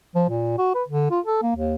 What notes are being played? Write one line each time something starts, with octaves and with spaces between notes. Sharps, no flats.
F3
A#2
F#4
B4
D3
F4
A4
A#3
D#2